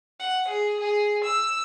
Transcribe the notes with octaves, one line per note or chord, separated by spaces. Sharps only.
F#5
G#4
G#4
E6